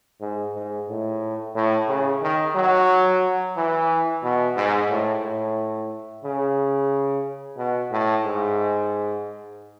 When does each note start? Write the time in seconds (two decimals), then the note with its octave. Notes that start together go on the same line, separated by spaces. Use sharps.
0.21 G#2
0.55 G#2
0.89 A2
1.55 A2
1.88 C#3
2.23 D#3
2.55 F#3
3.57 E3
4.23 B2
4.56 G#2
4.90 A2
5.24 A2
6.25 C#3
7.57 B2
7.92 A2
8.24 G#2